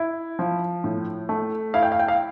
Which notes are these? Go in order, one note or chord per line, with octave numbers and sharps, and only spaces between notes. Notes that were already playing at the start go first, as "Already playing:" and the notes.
Already playing: E4
F3
A2
A3
E4 F5
G5
F5
G5
F5